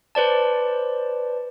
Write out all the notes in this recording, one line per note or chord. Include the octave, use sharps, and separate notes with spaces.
B4 C5 D5 A5